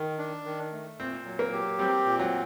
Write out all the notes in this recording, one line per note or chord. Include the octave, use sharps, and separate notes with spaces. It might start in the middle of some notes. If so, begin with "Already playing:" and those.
Already playing: D#3
D4
D#3
A3
A#2 C4
F#3
A#3
G4
G3 C4
A#2
F#3